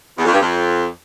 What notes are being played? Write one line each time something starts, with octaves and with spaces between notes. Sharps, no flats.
E2
F2
G2
F2